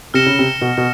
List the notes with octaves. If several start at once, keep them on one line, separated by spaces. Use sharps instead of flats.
C3 F6 A#6 C#7 E7 G7
C#3
C3
B2
B2